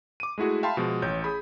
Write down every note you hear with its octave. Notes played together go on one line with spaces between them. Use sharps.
D6 D#7
G#3 A3 E4 F#4 G#4
E5 F5 G5 A5 B5 C6
B2 F3 G#3
A1 C#5 G6
G#4 B5